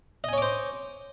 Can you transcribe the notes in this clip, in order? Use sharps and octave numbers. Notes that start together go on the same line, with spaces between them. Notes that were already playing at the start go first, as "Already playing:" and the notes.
C5 C#5 D#5 G#5 D6